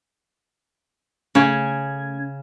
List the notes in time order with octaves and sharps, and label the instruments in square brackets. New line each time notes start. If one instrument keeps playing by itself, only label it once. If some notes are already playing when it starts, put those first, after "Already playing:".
[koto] C#3 [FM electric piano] A3 C#4 G#6